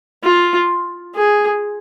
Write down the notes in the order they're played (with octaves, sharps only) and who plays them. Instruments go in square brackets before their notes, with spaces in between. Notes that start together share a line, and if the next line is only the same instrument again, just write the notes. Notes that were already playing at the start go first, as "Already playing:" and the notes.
[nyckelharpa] F4
G#4